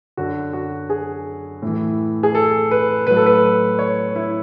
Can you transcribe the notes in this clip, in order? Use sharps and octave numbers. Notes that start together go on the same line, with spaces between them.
F#2 D3 F#3 F#4
F#4
G#4
A2 E3
G#4
A4
B4
A2 F#3 B4
A4
B4
C#5
E4